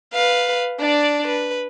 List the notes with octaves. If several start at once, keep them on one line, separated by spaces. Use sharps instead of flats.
B4 F5
D4 D5
B4